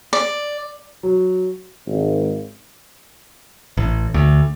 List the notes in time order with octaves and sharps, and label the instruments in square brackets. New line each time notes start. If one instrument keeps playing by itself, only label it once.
[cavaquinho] D5
[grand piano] F#3
[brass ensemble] G#1
[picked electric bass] A1
D2